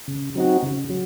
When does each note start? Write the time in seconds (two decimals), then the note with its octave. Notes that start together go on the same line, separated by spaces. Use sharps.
0.08 C#3
0.35 F#3 C4 D#4 F#4
0.63 C#3
0.90 F#3